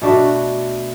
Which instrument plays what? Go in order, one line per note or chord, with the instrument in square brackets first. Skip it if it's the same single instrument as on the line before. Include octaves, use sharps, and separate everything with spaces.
[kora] B2 A3 D4 F#4